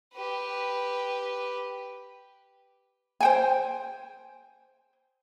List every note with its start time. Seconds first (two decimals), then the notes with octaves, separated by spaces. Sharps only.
0.14 G4 B4
3.20 C5 G5 G#5